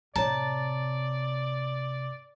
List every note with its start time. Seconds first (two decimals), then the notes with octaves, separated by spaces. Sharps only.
0.16 A2 C3 C#5 D5 A5 A#5